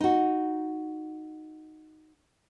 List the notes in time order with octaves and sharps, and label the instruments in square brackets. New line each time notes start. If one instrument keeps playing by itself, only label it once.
[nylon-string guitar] D#4 F#4